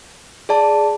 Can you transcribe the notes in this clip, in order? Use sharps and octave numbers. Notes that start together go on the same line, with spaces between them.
G#4 D5 A5